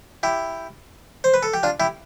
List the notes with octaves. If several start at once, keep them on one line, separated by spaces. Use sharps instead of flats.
E4 G4
C5
B4
A4
G4
D4 F4
E4 G4